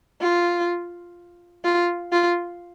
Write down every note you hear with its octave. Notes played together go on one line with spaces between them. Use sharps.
F4
F4
F4